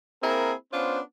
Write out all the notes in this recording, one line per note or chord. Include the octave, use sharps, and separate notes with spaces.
A#3 C4 E4 G#4 A#4
B3 C#4 D4 F4 C5